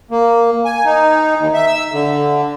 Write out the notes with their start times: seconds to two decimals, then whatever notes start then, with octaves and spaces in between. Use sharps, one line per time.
0.11 A#3
0.65 G#5
0.85 D#4
1.37 D#2
1.54 E5
1.67 E6
1.92 D3